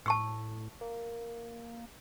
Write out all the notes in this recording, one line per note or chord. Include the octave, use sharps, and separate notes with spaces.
A2 A5 C#6 E6
A#3